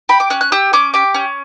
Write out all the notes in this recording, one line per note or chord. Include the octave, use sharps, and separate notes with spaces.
G4 B5
D6
C#4 F#6
F#6
G4 E6
C#4 D6
G4 D6
C#4